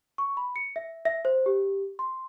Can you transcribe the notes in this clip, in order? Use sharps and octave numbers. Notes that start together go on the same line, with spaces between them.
C#6
B5
C#7
E5
E5
C5
G4
C6